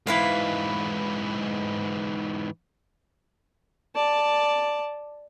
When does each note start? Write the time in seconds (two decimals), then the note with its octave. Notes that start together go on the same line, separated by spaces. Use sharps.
0.07 G#2 E3 E4 B4 F5
3.95 D5 A5